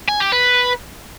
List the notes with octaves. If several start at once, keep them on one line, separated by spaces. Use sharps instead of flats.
G#5
G4
B4